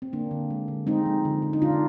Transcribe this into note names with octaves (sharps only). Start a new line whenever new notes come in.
C4
D3 A#3 D4
D3
G#3
D3
G#3 C4 D#4
F3
D3
D3
D#4
D3 D4 F4